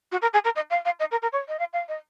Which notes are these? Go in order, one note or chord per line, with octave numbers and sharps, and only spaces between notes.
F#4
A#4
G#4
A#4
D#5
F5
F5
D#5
A#4
A#4
C#5
D#5
F5
F5
D#5